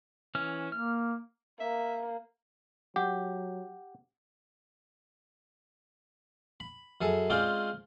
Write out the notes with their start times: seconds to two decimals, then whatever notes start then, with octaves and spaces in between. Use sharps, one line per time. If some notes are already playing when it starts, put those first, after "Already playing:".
0.35 E3 C#4 F6
0.72 A#3 F6
1.60 A#3 E5
2.96 F#3 G4 F#5
6.60 B5
7.01 F#2 G#4 A4 G#5
7.30 G#3 C4 C#4 F4 D5 G5